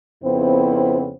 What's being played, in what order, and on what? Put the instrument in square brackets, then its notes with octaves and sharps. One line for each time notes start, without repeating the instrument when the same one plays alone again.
[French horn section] F2 C#3 B3 C4 E4 C5